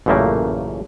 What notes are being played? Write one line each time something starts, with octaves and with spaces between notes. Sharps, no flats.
A1 F#2 A#2 C#3 A3 A#3